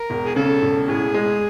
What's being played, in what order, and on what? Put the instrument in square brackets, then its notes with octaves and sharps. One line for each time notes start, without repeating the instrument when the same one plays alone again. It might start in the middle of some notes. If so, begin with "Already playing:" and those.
Already playing: [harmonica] A#4
[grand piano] E1
[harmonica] G#4
[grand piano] C#3 [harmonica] A4
[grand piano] E1
[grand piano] A2 [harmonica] G#4
[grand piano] G#3